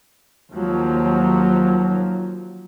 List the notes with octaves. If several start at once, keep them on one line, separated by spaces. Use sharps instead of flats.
D#2 F3 F#3